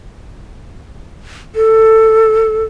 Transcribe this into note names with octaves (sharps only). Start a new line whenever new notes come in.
A4